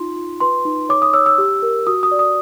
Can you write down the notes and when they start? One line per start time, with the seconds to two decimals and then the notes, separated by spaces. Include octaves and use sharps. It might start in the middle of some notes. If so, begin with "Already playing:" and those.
Already playing: D#4 F4 C6
0.16 F4
0.40 B4 C6
0.65 D#4
0.89 C#5 D6
1.02 D#6
1.14 C#5 E6
1.26 E6
1.38 G4
1.62 A#4
1.87 F#4 D#6
2.03 D#6
2.11 D5
2.19 D#6